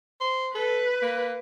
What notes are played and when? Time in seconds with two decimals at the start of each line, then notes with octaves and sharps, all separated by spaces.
0.21 C5
0.55 A4 B4
1.02 A#3